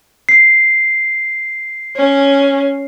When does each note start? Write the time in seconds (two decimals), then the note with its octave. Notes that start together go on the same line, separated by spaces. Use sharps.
0.29 C7
1.97 C#4